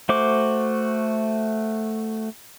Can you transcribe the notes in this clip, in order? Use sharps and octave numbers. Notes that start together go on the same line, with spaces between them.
A3 F#4 C5 D6